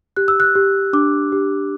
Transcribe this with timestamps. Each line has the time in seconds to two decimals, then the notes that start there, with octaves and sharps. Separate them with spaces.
0.16 G4 F#6
0.28 E6
0.40 F#6
0.55 G4
0.93 D4 D6
1.32 G4